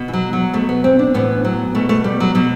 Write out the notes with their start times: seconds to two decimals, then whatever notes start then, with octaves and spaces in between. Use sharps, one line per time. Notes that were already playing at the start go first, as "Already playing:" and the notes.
Already playing: B2
0.08 E3
0.13 F#3
0.33 F#3
0.53 B2 A3
0.69 B3
0.84 C4
0.99 D4
1.14 A2 E3 B3
1.45 F#3
1.75 B2 A3
1.89 A3
2.04 G3
2.20 F#3
2.35 B2 F#3